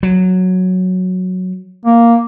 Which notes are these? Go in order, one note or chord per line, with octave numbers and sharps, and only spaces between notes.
F#3
A#3